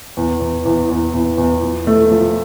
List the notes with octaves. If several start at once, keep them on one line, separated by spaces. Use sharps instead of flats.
E2
E2
E2
E2
E2
E2
F3
A3
F3